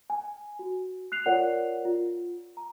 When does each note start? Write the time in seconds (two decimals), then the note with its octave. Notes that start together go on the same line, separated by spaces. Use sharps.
0.10 G#5
0.59 F#4
1.12 F#6 C7 F7
1.26 F4 A#4 C#5 D5 F#5
1.85 F4
2.57 A#5